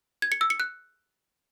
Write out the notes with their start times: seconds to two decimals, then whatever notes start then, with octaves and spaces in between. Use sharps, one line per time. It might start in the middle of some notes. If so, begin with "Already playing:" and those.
0.22 G#6
0.32 C#7
0.41 E6
0.50 C#7
0.60 F#6